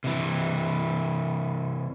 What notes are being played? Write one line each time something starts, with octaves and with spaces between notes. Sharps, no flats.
C3 E3